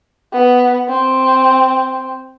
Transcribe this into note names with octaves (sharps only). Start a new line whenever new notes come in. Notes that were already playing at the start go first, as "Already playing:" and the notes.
B3
C4